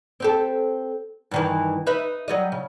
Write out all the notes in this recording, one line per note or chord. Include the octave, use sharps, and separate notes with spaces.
C4 G4 A4
G2 D#3 E3
D#4 B4 E5
F#3 G3 D#5
C#3